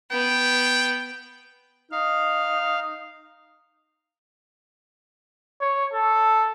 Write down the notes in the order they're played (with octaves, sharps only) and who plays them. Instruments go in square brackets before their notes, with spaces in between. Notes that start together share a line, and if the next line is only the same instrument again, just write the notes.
[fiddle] B3 [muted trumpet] G5
[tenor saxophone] D#4 [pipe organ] F5
[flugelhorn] C#5
A4